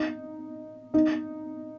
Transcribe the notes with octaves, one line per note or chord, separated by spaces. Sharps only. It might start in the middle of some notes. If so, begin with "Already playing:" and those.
Already playing: D#4
D#4